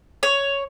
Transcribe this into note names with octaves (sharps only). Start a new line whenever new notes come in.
C#5